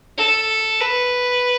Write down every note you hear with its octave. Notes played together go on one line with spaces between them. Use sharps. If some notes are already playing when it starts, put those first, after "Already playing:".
A4
B4